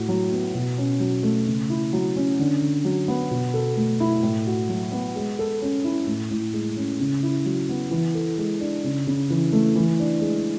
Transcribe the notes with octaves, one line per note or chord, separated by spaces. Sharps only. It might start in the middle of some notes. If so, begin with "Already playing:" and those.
Already playing: A2 F#4
F#3
B3
B2
C#4
F#3
A3
C#3
E4
F#3
C#4
D3
D3
F#3
B3
B2
A4
A3
E4
A2
F#4
F#3
B3
G#3
A4
C#4
E4
A2
A2
G#3
C#4
C#3
E4
F#3
B3
E3
A4
G#3
D4
C#3
C#3
E3
A3
E3
D4
G#3